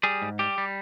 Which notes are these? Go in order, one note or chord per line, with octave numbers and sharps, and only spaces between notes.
G3 G#4
G#2
G3 G4
G3